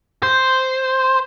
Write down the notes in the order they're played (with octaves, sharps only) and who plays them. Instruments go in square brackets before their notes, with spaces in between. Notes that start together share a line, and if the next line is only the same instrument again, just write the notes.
[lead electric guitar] C5